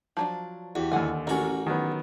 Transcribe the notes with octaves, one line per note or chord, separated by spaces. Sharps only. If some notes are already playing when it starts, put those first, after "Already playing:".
F3 F#3 D4
E2 F#4 G4
D#2 D3 F#5 G#5
A1 C#4 F#4 A#4
D#3 F#3 B3